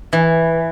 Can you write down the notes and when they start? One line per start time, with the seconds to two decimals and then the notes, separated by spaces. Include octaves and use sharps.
0.13 E3